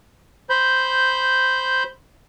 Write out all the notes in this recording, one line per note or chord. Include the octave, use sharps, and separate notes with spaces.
C5 B5 G6